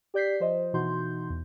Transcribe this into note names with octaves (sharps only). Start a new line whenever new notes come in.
G4 D5 G6 B6 C7
F3 C5 D#5
B2 E3 D#4 F#4 C6 G6
E2